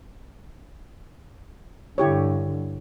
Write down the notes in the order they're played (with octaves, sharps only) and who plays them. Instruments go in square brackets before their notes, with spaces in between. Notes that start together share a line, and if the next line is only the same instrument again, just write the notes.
[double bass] G2 D3 [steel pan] E4 G4 C#5